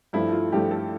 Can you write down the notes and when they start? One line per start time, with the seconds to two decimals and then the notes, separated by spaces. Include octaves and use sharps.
0.13 G2 F3 A3 E4
0.32 F4
0.52 G2 F3 A3 G4
0.71 A4